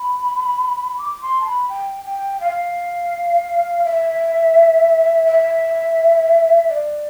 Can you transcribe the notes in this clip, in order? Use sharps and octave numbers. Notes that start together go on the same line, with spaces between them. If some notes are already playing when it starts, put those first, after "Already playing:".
Already playing: B5
D6
C6
A5
B5
G5
G5
F5
E5
E5
D5